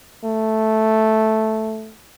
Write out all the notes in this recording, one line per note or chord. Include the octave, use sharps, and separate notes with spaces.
A3